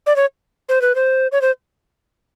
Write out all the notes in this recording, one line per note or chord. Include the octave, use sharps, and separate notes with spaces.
D5
C#5
C5
B4
C5
C#5
C5